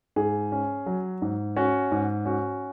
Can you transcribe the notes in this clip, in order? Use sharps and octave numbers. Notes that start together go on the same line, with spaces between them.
G#2 G#4
C#4
F#3
G#2
C#4 F#4
G#2
C#4 F#4